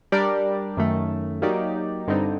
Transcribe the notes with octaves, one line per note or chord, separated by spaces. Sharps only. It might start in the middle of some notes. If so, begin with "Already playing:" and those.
G3 D4 G4 A#4 D5
F#2 D#3 A3
F#3 A#3 D#4 G4 D5
G2 D3 G3 C4 D#4